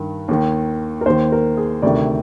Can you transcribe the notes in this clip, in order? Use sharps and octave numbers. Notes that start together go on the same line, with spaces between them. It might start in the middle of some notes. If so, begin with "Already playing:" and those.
Already playing: G2 D#3
D#2 D#3
A#4
D#2 D#3 C5
A#4
G#4
D2 C3 D#3 D5